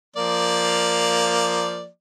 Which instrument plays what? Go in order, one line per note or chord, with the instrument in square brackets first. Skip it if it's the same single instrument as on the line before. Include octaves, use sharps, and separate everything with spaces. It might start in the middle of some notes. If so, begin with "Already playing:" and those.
[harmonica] F3 A#3 D5